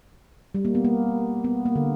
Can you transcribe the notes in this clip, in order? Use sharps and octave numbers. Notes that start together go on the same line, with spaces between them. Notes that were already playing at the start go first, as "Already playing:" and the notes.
G3
A#3
B3
A#3
B3
A#3
D3